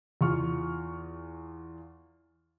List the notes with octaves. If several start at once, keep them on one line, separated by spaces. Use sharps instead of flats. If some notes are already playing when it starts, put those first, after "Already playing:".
E2 F4 C#6 F6